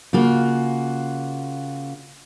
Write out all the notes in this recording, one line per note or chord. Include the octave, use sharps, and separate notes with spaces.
C#3 A#3 F4 F#4